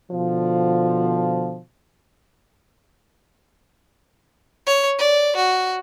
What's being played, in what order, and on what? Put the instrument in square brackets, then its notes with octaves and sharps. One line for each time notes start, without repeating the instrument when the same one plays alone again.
[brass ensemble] B2 D3 F3
[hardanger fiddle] C#5
D5
F#4